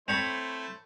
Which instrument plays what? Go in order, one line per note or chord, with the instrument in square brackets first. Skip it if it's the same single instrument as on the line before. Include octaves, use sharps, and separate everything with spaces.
[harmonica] A3 E4 C5 [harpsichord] C4 C#5 B5